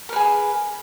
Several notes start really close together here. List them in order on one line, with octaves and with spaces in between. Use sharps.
A#4 B4 G#4